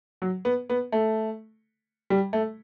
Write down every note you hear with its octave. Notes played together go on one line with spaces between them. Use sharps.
F#3
B3
B3
A3
G3
A3